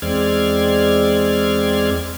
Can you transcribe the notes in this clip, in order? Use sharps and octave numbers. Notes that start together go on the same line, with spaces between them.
E2 G#3 C4 D5 F6 G#6